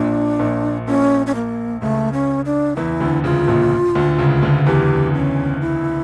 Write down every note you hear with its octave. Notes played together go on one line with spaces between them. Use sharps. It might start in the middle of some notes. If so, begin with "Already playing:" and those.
Already playing: A#1 A#2 D4
A#1 A#2
A#1 A#2 C#4
C#4
A#3
C#2 C#3 A3
C#4
D4
E2 E3 E4
D2 D3
C#2 C#3 F4
A#1 A#2
D2 D3
C#2 C#3
D2 D3
E2 E3 G4
C#4
E4